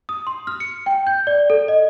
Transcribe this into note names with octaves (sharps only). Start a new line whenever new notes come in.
D#6
C6
F6
C#7
G5
G6
D5
A4
D#5